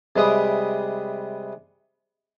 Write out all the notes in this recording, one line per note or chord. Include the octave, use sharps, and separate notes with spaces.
C3 G3 G#3 B4 E5 D#6